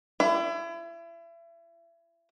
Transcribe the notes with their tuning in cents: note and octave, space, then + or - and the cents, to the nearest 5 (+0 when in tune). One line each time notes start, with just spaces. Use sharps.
E4 +35